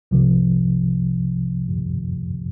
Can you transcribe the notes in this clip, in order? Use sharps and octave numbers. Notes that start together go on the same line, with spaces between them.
C2 C3 F3